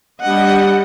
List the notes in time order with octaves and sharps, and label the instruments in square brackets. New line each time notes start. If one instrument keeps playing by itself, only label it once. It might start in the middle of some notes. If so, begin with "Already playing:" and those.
[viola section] G3 D4 D#5 F#5